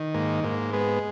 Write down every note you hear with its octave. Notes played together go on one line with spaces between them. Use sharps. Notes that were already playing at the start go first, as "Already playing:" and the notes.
Already playing: D#3
G#2 A#3
G#2 A#3
G#3 B3